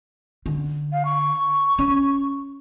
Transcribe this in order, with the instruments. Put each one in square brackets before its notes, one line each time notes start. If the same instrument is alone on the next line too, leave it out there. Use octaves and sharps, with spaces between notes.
[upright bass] D3
[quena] F5
C#6
[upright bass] C#4